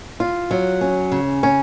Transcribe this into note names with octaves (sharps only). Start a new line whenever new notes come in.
F4
F#3
C#4
C#3
C#4